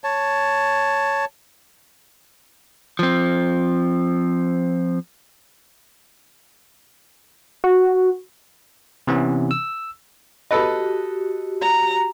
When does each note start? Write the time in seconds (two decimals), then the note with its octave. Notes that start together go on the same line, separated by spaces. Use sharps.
0.04 C#5 A5
2.99 F3 C4
7.64 F#4
9.07 C3 E3 B3 C#4
9.51 E6
10.51 F#4 G4 A4 B4 D#5
11.62 A#5